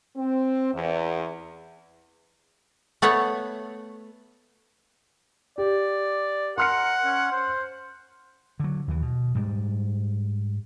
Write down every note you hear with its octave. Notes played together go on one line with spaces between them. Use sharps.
C4
E2
A3 B3 C#5 F#5
G4 D5
A#4 F#5 C6 F6 C#7
C#4
C5
D3 F#3
D#2 E3
B2
G#2 G3